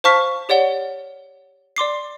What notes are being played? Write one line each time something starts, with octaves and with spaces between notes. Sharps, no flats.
C5 F5 A5 C#6 F6 B6
G4 C#5 D5 F#5 G7
D5 C6 D6 C7